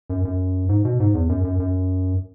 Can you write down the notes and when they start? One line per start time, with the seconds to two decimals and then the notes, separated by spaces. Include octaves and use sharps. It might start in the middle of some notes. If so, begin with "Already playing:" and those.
0.10 F#2
0.25 F#2
0.69 G#2
0.85 B2
1.00 G#2
1.14 E2
1.29 F#2
1.44 F#2
1.60 F#2